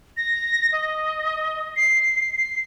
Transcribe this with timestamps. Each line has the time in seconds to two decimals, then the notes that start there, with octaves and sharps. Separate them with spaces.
0.17 A#6
0.72 D#5
1.76 C7
2.38 C7